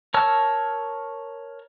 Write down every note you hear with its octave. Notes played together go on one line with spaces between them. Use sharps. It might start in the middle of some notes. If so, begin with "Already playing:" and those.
A#4 C#5 A5 E6 F6